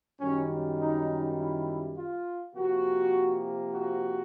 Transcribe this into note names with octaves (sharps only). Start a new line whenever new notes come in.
F#2 D#3 G3 C#4
D#4
E4
F4
C3 F3 A#3 F#4
F#4